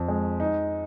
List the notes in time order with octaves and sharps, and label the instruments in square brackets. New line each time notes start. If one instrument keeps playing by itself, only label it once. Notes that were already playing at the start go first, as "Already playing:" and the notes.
Already playing: [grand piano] F2
G#3
D#4